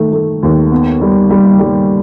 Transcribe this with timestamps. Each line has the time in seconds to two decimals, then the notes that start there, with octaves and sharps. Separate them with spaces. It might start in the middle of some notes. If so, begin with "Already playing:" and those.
Already playing: D#3 A3
0.13 A3
0.43 D#2
0.71 B3
1.01 G3
1.30 G3
1.59 G3